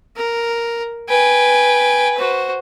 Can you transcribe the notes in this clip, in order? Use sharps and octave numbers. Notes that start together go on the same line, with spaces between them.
A#4
B4 G5 G#5
F#4 C5